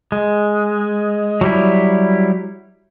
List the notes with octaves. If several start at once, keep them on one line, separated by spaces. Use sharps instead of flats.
G#3
F#3 G3 E4